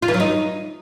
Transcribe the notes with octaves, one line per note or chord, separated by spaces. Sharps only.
F4
E3
F#3
D#4